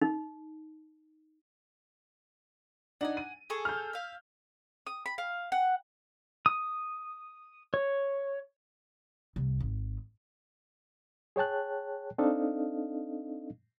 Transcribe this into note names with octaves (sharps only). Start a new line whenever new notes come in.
D#4
D4 D#4 F#5 G#5
D#7
G#4 A4 C#6
F6 G6
E5 F5
D#6
B5
F5
F#5
D#6
C#5
C2
G#1
G#4 C#5 G5 A5 F#6
C4 D4 D#4 A4 D#5 F5